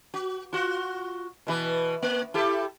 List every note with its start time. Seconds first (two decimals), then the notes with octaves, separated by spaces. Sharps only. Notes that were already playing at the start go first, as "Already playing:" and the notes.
0.14 F#4
0.53 F4 F#4
1.47 B2 E3 B4
2.02 A#3
2.34 E4 G4 A4